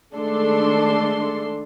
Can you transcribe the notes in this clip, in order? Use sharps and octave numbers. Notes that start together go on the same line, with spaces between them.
D#3 G#3 A3 D4 A4 C6